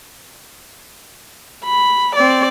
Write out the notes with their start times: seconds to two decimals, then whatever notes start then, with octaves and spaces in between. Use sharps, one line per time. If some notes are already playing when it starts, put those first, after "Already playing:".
1.65 B5
2.16 C4 D5